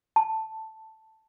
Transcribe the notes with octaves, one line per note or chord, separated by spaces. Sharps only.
A5